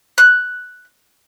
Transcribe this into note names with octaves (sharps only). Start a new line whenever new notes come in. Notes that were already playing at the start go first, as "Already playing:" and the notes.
F#6